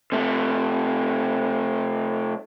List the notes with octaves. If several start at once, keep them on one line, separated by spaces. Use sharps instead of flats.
C3 A3